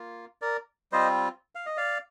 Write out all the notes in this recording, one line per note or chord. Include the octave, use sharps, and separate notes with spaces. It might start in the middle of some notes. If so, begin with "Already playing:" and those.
Already playing: A#3 F4
A#4 D5
G3 C4 F4 C5 D#5
F5
D#5
D5 F5